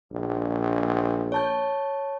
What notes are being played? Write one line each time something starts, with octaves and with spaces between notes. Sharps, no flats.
A#1
C#5 A5 G6